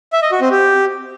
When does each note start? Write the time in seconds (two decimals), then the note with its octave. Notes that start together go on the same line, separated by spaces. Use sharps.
0.13 E5
0.22 D#5
0.32 F#4
0.41 C4
0.51 G4